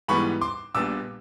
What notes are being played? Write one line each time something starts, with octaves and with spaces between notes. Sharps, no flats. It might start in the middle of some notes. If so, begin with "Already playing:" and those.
G#2 E3 G3 B3 B5 C#6
C6 D6
A#1 A#2 G3 B3 D4 D6 E6